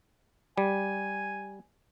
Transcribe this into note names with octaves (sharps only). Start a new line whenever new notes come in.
G3 G#5